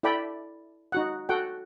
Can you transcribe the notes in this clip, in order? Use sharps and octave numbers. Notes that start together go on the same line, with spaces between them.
E4 A4 D5 G5 B5
D#4 F#4 F#5
F#4 A4 F#5 G5